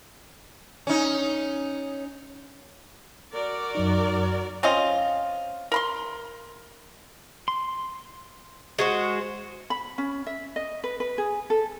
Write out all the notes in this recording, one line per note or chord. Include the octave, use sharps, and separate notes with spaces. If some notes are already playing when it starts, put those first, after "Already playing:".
C#4 D#4
F#4 A#4 D5
F#2 F#3 D#4
C4 C#4 F4 D#5
A#4 B5 C6
C6
G#3 F#4 C5
B5
C#4
E5
D#5
B4
B4
G#4
A4